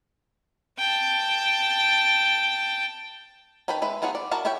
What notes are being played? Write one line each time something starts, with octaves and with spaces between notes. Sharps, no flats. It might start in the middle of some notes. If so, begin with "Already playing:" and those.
G5 A5
D#3 B4 G5 A5 B5
G#3 B4 E5
F#3 B3 F4 G#4 F#5
D5
E4 F#4 A#4 A5
E4 G4 C#5 E5 G5